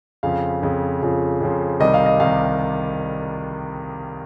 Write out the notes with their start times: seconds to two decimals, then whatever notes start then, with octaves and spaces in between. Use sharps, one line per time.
0.23 F2 C#3 F3 F5
0.62 F2 C#3 F3
1.02 F2 C#3 F3
1.41 F2 C#3 F3
1.80 C2 C3 D#3 G3 D#5
1.94 F5
2.06 D#5
2.20 C2 C3 D#3 G3 F5